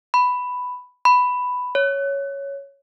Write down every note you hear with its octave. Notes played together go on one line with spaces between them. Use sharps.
B5
B5
C#5